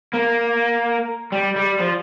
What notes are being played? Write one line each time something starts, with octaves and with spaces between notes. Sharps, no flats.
A#3
G3
G3
F3